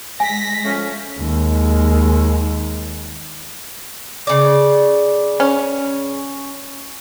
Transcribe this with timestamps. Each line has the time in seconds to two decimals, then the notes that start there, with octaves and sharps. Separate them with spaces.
0.20 G#3 G#5 A#6 B6
0.64 F3 A3 C#4
1.20 D#2 G#3
4.27 C#3 D5
5.40 C#4